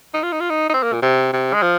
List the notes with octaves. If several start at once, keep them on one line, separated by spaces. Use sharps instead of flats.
D#4
F4
D#4
F4
D#4
D#4
C4
A#3
A#2
C3
C3
G#3
F3